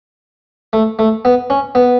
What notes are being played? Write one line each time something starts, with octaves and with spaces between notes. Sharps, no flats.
A3
A3
B3
C#4
B3